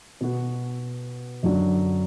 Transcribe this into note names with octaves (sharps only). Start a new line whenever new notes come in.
B2 B3 F#4
F#2 D3 F#3 D4